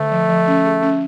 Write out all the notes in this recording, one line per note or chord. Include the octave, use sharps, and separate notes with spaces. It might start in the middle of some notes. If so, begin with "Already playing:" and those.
Already playing: D3 A3
F3
F3
C#4
G#4
C#4